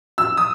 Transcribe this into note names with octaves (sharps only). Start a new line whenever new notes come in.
E6
D#6